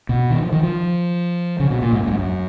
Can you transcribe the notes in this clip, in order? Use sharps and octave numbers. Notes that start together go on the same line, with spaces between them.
B2
D#3
F3
D#3
F3
C#3
B2
A#2
G#2
F#2
G#2
F#2